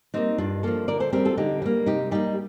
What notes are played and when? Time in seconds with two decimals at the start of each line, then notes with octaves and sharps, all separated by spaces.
0.14 G3 A#3 C4 D#4
0.38 G2 D4 F4
0.63 F3 A#3 F4 A4
0.88 D3 A#4 D5
1.00 A4 C5
1.13 G3 C4 G4 A#4
1.25 F4 A4
1.37 D3 D#4 G4
1.62 G3 A#3
1.86 C3 D#4 G4
2.11 G3 A#3 D#4 G4